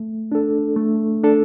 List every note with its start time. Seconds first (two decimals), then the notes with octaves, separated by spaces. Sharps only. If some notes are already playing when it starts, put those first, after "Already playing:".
Already playing: A3
0.32 D4 A4
0.77 A3
1.23 D4 A4